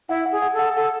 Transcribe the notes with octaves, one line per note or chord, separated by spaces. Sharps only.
E4 F#5
F#5
G#4
F#5
A4
F#5
A4 F#5